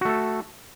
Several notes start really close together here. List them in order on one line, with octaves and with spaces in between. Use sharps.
F#4 A3 A4